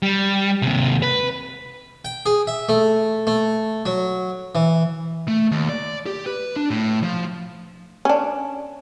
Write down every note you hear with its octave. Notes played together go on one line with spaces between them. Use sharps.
G3
D#2 C3
B4
G5
G#4
E5
A3
A3
F#3
E3
A3
D#2
D5
G4
B4
D4
A2
F3
C#4 D4